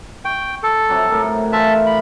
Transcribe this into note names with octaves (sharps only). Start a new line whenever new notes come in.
G5 C#6
A4
C3 F#3 G3
A2 A#4
E3 E5 F5 A5 C6
B5